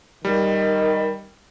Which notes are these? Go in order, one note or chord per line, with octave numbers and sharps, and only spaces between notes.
D#3 G3